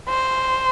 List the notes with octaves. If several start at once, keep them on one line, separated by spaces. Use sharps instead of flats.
C5